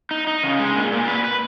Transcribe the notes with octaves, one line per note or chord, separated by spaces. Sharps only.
D#4
D#4
C#3
G#3
A#2
A#2
B4
B4